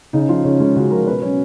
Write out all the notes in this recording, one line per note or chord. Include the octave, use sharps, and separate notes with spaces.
C#3 D#4
F3 F4
C#3 C#4
G#3 C#4
C#3 F#4
F3 A#4
B2 B4
F#3 C#4